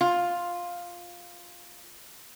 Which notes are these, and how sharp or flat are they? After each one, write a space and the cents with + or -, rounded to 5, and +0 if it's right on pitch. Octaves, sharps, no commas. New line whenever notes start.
F4 +5